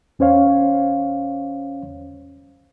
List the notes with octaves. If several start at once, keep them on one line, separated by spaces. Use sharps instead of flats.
E2 C#4 C5 C#5 F5